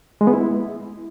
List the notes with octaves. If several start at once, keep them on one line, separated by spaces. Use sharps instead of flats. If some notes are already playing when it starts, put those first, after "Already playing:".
G#3
B3
E4